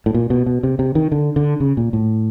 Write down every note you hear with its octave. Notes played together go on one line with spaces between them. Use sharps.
A2
A#2
B2
B2
C3
C3
D#3
D3
D3
C#3
A#2
A2